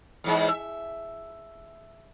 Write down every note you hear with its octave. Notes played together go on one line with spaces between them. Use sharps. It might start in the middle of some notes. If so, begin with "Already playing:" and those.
E2 G#2 G#3
E5